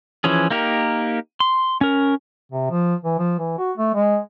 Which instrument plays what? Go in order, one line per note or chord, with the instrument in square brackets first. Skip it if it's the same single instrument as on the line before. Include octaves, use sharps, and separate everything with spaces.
[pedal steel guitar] E3 F3 C#4 G#4
A#3 D#4 G4 A#4
C6
C#4 A#4
[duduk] C3
F3
E3
F3
E3
F#4
A3
G#3